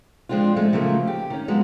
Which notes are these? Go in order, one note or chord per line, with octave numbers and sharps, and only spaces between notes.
F3 G#3 C4 D4 F4
F3 G#3 A3
C#3 F3 F#3 A3 A#3
G4
D#3 C#4
F3 F#3 G#3 B3 F#4